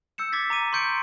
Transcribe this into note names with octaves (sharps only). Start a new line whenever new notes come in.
E6 G6 C#7 E7
D6 G#6 A6 B6
A#5 D6 D#7
C6 C#6 G6 C#7 D7